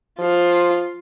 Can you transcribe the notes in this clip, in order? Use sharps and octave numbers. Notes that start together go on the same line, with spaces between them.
F3 F4